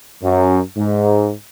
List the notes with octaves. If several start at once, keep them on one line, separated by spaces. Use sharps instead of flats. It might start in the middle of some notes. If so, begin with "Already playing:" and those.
F#2
G#2